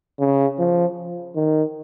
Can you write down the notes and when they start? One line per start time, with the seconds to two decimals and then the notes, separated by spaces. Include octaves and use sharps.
0.20 C#3
0.59 F3
1.36 D#3